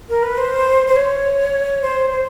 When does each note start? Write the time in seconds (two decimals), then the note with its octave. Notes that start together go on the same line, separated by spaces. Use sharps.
0.09 A#4
0.23 B4
0.38 C5
0.87 C5
0.96 C#5
1.82 C5
2.11 C5